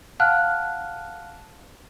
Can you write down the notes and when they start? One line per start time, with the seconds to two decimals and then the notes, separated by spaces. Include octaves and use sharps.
0.20 F5 F#5 A5 F6 F#6